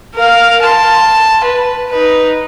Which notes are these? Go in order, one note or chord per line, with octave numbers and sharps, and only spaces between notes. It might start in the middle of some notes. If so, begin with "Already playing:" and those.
A#4 F5
A5 C6
B4
D#4 B4